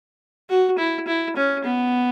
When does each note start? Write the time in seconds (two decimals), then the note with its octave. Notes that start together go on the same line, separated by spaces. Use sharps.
0.49 F#4
0.78 E4
1.08 E4
1.37 C#4
1.65 B3